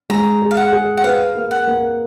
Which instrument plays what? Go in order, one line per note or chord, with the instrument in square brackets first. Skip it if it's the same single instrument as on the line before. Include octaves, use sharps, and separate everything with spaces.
[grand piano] G#3 [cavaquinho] A#5
[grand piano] G#4
[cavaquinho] F5
F#5
[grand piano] G#4
[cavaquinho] F#5
[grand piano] B4 [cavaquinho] F5
[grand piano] A#3
[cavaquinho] F#5
[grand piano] A#3